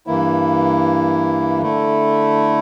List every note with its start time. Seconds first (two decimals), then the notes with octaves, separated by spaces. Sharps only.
0.07 G2 E3 A#3 E4
1.62 D3 A3 E4